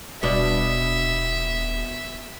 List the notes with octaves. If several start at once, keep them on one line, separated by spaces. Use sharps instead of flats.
D#1 B2 D4 E5